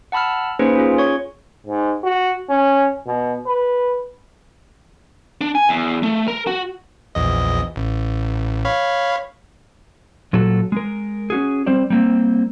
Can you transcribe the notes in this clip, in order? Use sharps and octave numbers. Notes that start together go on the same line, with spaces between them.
F#5 A5 B5 E6 F6
A#3 C#4 D#4 G#4 B4 C5
C#4 F4 G#4
C#5 C#6
G#2
F#4
C#4
B2
B4
D4
G#5
E2
A3
A#4
F#4
A#1 E2 D#5
A1
C#5 F5 B5
A#2 F#3 F#4 A4
G#3 A#4
C#4 F#4 G#4
G3 C4 C5 D5
G3 A#3 C4